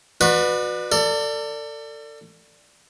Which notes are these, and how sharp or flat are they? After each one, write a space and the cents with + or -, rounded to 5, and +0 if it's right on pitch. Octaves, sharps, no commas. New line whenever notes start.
F#4 -25 B4 +0 D5 +35
A4 +35 D5 +0